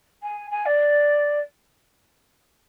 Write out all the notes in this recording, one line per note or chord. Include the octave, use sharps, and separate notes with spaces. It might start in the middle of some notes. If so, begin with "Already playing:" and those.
G#5
G#5
D5